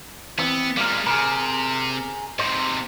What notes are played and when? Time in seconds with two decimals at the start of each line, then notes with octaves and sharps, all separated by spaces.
0.38 E3 B3 C4
0.77 G3 G#3 A#3 F4 A#4
1.07 C3 G#4 A#4
2.39 G#2 C3 C5